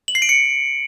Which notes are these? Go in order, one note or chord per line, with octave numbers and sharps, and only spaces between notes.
F#7
C7
D7
C#7